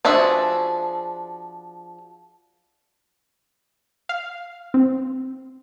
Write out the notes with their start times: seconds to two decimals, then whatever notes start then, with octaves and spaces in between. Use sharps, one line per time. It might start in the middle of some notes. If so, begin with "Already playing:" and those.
0.05 F3 D4 F#4 G#4 E5
4.09 F5
4.74 C4